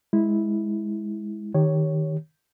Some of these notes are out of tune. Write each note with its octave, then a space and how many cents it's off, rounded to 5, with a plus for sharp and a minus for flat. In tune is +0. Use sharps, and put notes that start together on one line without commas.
G#3 +0 E4 -10
D#3 +0 G4 +0 C#5 +0